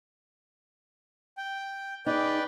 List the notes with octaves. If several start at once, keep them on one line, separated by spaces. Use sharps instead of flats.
G5
D#4 G#4 B4 D5 G5